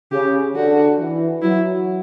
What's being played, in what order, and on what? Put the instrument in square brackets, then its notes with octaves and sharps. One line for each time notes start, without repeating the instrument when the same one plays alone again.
[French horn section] C#3 [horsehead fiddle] G4
[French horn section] D3 [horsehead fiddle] F#4
[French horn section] E3
[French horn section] F#3 [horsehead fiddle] E4